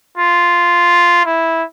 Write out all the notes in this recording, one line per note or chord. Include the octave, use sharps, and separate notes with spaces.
F4
E4